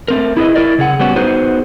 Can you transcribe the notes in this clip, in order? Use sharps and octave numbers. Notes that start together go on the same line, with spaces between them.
A3 C4 A#4
E4 G#4 B4 D#5
E4 F#4 A#4 D5 D#5
C#3 G#4 F#5
G3 B3 C#4 F#4
B3 D#4 F#4 G#4 B4 C5